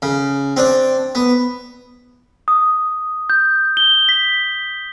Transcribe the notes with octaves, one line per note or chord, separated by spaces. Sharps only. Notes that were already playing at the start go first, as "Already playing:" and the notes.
C#3
C4 D4 D5
B3
D#6
G6
G7
B6